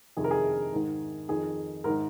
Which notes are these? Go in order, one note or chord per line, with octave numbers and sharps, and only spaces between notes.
F2 C3 D#3 G#4
A#4
G#4
G#2 D#3
F2 D#3 G#4
G#2 A#4
D#3